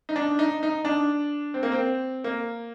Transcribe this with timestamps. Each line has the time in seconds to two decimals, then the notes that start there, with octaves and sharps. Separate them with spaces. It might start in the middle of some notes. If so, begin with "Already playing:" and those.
0.09 D#4
0.16 D4
0.39 D#4
0.63 D#4
0.85 D4
1.54 C4
1.63 A#3
1.72 C4
2.24 A#3